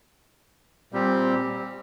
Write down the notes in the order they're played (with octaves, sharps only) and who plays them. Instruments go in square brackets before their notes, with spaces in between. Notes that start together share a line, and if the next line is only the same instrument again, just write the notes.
[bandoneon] A#2 G3 C4 G4